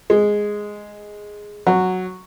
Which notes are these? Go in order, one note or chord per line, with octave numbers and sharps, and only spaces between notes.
G#3
F#3